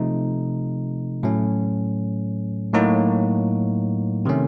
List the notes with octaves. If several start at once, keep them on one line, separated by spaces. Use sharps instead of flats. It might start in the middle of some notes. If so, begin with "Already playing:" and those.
Already playing: C3 F3 A3 D#4
A2 F#3 A3 C#4
A2 F#3 A#3 D#4 F#4
C3 D#3 A3 C#4